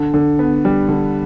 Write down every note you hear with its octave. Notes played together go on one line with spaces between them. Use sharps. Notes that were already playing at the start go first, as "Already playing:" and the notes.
Already playing: D3
D3
B3
G3
D3